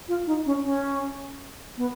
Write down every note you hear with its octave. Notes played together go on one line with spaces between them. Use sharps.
F4
D#4
C#4
C#4
B3